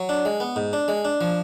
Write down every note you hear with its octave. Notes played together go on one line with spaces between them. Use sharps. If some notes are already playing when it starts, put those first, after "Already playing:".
Already playing: F#3
D4
G#3
B3
G#2
D4
G#3
D4
F3